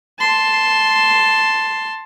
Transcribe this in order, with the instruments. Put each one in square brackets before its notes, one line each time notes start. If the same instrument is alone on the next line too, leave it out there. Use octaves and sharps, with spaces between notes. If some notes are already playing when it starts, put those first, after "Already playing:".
[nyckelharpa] A5 C6